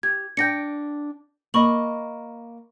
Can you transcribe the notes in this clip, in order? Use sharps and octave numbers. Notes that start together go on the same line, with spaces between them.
G4 G#6
D4 G5 G6 A#6 C#7
A#3 D#5 B5 C#6 F#7